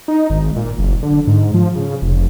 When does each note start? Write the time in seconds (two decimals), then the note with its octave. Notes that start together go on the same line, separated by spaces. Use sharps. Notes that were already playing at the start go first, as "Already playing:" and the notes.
0.08 D#4
0.30 G#1
0.56 A#2
0.79 F#1
1.03 D3
1.27 G#2
1.54 F3
1.75 C#3
2.02 F1